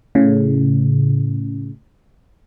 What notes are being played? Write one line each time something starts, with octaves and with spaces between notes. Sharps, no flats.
A2 C#3